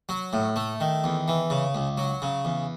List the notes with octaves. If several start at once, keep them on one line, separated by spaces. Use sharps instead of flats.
F#3
A2
A3
D#3
E2
E3
C#3
C#2
F#3
C#3
E2